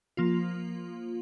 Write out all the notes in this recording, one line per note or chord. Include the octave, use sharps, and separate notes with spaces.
F3 A#3 F4